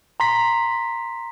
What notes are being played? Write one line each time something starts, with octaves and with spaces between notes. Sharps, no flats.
A#5 C6 B6